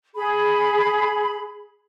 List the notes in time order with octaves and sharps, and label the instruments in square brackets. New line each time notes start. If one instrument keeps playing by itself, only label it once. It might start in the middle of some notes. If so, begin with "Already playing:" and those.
[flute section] G#4 B5